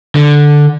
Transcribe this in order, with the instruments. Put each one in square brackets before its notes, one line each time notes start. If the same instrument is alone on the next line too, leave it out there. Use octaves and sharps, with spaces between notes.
[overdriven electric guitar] D3